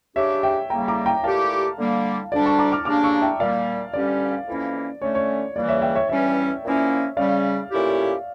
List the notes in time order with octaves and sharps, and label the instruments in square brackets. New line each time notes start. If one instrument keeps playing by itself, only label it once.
[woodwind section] C#3 G3 D4 G4 [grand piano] C#5 E5
[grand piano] E5 G5
[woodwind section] C#3 G3 A#3 [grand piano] G5 A#5
[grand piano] A#5 D6
G5 A#5
[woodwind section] A#2 A3 E4 G4 [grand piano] F5 A5
[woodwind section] D3 G3 A#3
[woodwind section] D2 D3 G3 D4 [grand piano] D5
[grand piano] A5 C#6
A#5 D6
D6 F6
[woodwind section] C#3 G3 A#3 D4 [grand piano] D6 F6
[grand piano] C#6 E6
E5 G5
[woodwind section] A#2 G3 A#3 [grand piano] D5 F5
[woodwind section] G2 D3 G3 C#4 G4 [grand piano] D5
[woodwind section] F2 E3 A#3 C#4 E4
[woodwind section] D3 A3 C#4 [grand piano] C#5
[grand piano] C#5
[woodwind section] C#2 C#3 E3 G3 A#3 [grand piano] D5
[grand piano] C#5 E5
E5 G5
C#5 E5
[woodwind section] G2 E3 G3 C#4 [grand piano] C#5 E5
[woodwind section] A#2 F3 A#3 C#4 E4
[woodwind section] C#3 G3 C#4 [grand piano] D5 F5
[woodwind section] A#2 A3 C#4 E4 G4